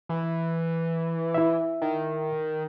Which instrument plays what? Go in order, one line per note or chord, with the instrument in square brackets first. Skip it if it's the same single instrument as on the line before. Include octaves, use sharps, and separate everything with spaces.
[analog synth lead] E3
[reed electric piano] E4 E5
[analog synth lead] D#3